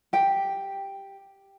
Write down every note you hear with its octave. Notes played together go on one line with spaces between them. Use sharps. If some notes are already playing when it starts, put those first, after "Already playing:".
G4 G5